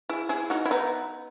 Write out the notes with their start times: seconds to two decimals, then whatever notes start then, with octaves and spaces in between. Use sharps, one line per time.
0.09 E4 G#4
0.29 E4 G#4
0.50 D#4 F#4
0.65 E4
0.71 B3 D#4